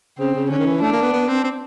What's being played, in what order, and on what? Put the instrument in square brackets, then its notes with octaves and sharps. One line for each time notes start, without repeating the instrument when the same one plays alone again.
[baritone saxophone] C#3 [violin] C4
[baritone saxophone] C#3
[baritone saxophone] D3 [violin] C#4
[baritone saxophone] D#3
E3
[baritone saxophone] A3 [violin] D4
[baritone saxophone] A#3
B3
B3
C4
C4